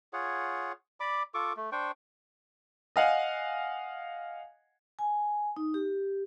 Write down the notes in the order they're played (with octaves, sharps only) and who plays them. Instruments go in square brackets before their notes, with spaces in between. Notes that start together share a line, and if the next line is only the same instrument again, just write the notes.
[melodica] F4 G#4 C#5 F#5
D5 B5 D6
F4 A4 C#6 D6
A3
D4 C5 G5 C#6
[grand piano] D#5 F5 F#5 G#5
[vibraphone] G#5
D#4
G4